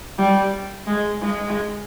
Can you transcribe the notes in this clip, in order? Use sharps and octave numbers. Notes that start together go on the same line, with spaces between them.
G3
G#3
G#3